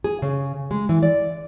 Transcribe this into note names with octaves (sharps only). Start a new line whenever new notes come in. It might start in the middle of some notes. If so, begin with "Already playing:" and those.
G#4
C#3
G#3
E3
D5